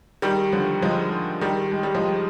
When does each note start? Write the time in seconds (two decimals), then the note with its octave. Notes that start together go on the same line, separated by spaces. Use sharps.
0.22 D#3 G3
0.52 D3 F3
0.82 F3 G#3
1.41 D#3 G3
1.71 G#3
1.83 G3
1.95 F3 G#3